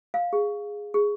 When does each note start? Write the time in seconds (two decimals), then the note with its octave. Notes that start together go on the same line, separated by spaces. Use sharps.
0.14 F5
0.33 G#4
0.94 G#4